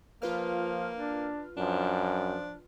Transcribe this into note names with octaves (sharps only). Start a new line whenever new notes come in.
F3 A#3 F4 B4 F6
D4
F#2 F3 D4